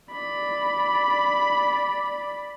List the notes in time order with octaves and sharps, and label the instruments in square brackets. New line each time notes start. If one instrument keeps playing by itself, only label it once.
[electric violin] D5 B5